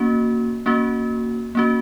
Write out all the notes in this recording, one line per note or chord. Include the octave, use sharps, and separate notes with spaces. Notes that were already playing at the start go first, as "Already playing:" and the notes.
Already playing: A#3 C#4 F#4
A#3 C#4 F#4
A#3 C#4 F#4